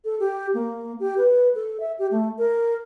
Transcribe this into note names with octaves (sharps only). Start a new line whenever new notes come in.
A4
G4
A#3
G4
B4
A4
E5
G4
A3
A#4